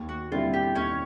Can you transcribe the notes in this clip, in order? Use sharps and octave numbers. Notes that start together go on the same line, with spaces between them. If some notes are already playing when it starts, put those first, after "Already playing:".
Already playing: D#2
F#4
D3 G3 C4 E4 F4
G4
D#2 C#4 C#5